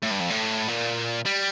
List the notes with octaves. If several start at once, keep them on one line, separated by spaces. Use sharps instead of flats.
A2
G2
F2
A2
A#2
G3